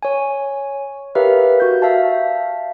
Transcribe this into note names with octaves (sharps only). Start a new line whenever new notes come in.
C#5 G#5
G4 A#4 B4 C#5 E5 F5
F#4 G6
E5 F5 A5